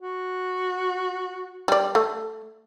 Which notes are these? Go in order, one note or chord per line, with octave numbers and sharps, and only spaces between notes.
F#4
G3 D5
A3